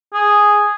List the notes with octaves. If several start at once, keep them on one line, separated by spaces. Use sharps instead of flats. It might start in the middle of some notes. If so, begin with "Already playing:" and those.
G#4